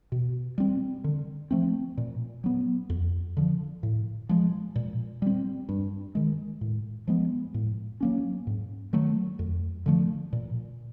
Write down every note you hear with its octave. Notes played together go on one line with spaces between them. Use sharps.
B2
G3 C4
D3
F3 A3 C4
A#2
F#3 B3
F2
D3 F3
A2
F3 G#3
A#2
G3 C4
G2
D#3 G#3
A2
F3 G#3 B3
A2
F#3 A#3 C#4
G#2
D#3 F#3 A3
F2
D3 F3 A3
A#2